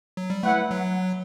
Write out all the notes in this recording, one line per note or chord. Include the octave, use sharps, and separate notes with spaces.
F#3
G3
A3 E4 B4 F#5
F#3